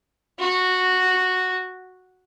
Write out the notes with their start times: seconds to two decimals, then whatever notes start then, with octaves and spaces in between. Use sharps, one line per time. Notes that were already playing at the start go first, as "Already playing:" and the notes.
0.39 F#4